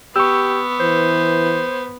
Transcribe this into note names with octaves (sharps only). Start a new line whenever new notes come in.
B3 G4 C#6 E6
E3 C5